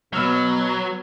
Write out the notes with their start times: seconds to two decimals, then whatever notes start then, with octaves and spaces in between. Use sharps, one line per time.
0.13 B2 F#3 B3 E6 F6